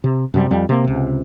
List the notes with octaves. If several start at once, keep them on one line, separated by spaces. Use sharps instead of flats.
C3
F#2 C3 G3
F2 G3
C3 A#3
C#2 C3